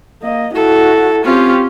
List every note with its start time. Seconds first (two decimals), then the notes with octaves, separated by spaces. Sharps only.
0.22 A#3 D#5
0.55 E4 F#4 A4
1.25 C4 C#4 F4 G4